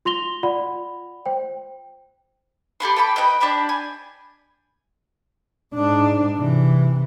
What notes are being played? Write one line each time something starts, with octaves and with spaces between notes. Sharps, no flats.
F4 C6 A#6 F7 G7
F4 D5 F#5 B5
C5 G5
G4 A4 B5 C6
G5 A5 B5 D6
B4 D#5 G5 B5
D4 G4 A5 B5
G#5
G#2 D4
C3 E3